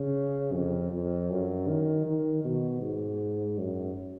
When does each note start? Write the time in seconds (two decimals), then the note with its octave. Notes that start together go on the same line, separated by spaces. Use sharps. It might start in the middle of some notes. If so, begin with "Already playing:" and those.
Already playing: C#3
0.54 F2
0.93 F2
1.30 F#2
1.68 D#3
2.06 D#3
2.44 B2
2.82 G#2
3.58 F#2